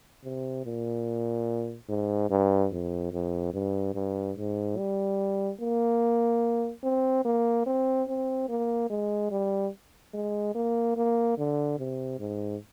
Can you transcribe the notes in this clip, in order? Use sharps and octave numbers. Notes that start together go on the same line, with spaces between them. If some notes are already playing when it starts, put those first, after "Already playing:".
C3
A#2
G#2
G2
F2
F2
G2
G2
G#2
G3
A#3
C4
A#3
C4
C4
A#3
G#3
G3
G#3
A#3
A#3
D3
C3
G#2